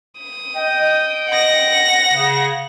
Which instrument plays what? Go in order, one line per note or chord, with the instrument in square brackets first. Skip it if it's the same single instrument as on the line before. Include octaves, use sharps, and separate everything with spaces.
[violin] D#6
[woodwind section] D#5 G5
[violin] F#5 A#6
[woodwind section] C#3